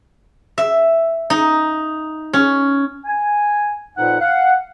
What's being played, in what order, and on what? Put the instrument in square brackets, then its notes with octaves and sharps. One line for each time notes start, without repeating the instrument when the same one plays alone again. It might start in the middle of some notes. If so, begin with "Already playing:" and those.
[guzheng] E5
D#4
C#4
[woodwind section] G#5
F2 A#2 D#4 B4 F#5
F5 F#5